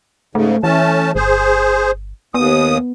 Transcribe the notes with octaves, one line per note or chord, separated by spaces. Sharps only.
G#2 C#3 A3
E3 A3 C#4 A5
G1 G#4 C5
D#2 B3 D#6